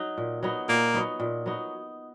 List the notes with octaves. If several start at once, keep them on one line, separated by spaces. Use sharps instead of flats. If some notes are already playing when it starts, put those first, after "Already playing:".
Already playing: F#3 D#4
A#2
F#3 B3 D#4
A#2 A#3
F#3 B3 D#4
A#2
F#3 B3 D#4